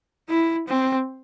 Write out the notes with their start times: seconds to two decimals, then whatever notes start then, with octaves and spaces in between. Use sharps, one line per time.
0.29 E4
0.68 C4